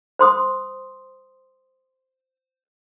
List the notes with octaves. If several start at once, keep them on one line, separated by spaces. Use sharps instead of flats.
C5 C6 D#6